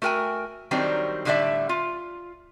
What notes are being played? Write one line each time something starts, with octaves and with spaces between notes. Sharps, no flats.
A3 F#4 A#4 G5 G#5
D#3 F#3 G3 C4 D4 D#4
A2 D3 G3 A3 D5 E5
F4